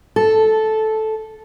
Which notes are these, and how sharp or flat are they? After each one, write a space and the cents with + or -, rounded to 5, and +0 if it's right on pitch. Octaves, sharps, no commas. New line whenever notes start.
A4 -10